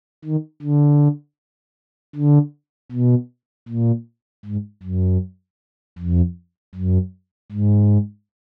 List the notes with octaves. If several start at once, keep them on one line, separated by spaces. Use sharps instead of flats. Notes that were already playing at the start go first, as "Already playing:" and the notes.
D#3
D3
D3
B2
A#2
G#2
F#2
F2
F#2
G#2